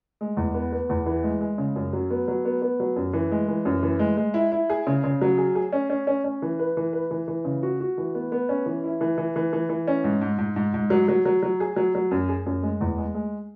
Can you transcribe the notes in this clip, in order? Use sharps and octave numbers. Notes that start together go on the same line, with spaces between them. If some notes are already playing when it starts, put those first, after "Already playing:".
G#3
E2
B3
B3
E2
E3
G#3
G#3
C#3
F#2
F#3
B3
F#3
B3
B3
F#3
F#2
E3
G#3
E3
F#2
E3
G#3
G#3
E4
E4
G#4
C#3
C#3
F#3
G#4
G#4
C#4
C#4
C#4
C#4
E3
B4
E3
B4
E3
E3
C#3
F#4
F#4
E3
B3
B3
C#4
E3
E4
E3
E3
E3
E3
E3
C#4
G#2
G#2
G#2
G#2
G#2
F#3
F#3
F#3
F#3
G#4
F#3
F#3
F#2
G#4
F#2
G#3
E2
G#3
G#3